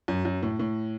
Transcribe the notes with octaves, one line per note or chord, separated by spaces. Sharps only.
F#2
F#2
A2
A2